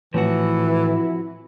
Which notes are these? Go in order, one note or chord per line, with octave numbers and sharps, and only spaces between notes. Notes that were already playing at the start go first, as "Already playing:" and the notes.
A2 E3 F3 C4 E4 F#4